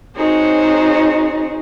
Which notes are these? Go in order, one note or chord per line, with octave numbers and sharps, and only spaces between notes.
C4 D#4 F#4 G#4 C5 C#5